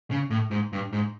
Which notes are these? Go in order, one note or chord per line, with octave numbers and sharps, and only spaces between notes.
C#3
A2
G#2
G2
G#2